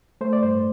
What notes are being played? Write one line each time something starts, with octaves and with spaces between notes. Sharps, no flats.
A3 C5
D5
G2 C5